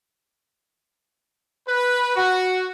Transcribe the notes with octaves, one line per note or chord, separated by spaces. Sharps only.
B4
F#4